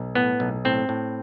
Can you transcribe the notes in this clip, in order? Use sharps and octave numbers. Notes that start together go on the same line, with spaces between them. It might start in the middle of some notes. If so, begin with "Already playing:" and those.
Already playing: B1
A2 B3
B1
A2 C4
A2